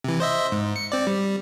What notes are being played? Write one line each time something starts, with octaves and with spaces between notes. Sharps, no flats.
C3 E3
C5 D#5 E5
G#2
C#7
C4 D5
G3